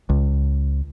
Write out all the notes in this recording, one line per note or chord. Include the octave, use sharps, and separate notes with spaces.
C#2